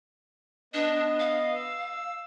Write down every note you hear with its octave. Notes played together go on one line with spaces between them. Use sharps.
B3 D4 D#5
F5
E6